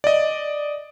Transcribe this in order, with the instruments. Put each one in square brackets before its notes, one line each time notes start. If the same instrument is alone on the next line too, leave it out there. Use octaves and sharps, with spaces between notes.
[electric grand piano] D5 D#5